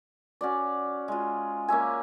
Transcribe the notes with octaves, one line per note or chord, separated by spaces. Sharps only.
C#4 F#4 D5
G#3 F4
A#3 C#4 E5 G#5